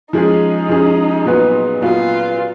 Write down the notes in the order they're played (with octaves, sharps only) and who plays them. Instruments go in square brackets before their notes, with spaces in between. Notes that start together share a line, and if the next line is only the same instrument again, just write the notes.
[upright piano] F3 G#3 C#4 G#4 [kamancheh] D#4
[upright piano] F3 G#3 C#4 G#4
A#2 F#3 B3 F#4 B4
[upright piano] A#2 F#3 B3 F#4 B4 [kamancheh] F4
[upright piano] F4